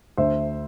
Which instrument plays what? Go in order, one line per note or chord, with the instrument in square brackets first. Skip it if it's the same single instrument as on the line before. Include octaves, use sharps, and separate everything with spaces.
[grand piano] D2 C5 E5